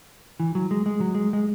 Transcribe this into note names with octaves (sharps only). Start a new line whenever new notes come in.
E3
F#3
G#3
G#3
F#3
G#3
G#3